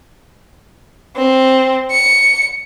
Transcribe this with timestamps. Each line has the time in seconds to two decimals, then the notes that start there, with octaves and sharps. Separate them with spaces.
1.16 C4
1.91 C#7